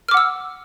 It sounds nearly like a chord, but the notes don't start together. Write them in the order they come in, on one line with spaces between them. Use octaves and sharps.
F6 D6 F#5 E6